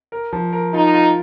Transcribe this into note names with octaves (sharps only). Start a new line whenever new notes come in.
A#4
F3
A#4
D#4 F4
F4